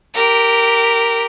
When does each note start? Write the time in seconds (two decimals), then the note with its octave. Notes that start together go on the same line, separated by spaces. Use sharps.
0.14 G4 A#4